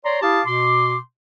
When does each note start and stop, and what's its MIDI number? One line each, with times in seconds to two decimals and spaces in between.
0.06 0.20 73
0.06 0.20 74
0.06 0.20 82
0.06 0.20 84
0.22 0.41 64
0.22 0.41 67
0.22 0.41 77
0.22 0.41 81
0.22 0.41 86
0.22 0.41 87
0.46 0.98 47
0.46 0.98 84
0.46 0.98 86